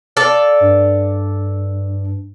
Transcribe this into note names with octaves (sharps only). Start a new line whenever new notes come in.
A4 D5 F5
G2